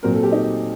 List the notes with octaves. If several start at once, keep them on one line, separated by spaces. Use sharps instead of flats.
A#2 F#3 C4 A#4
A4
G4
D#4